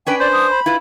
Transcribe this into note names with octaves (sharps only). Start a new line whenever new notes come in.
C#4 D4 B4 G5
C5 D5
D#6
B5
E4 F4 B4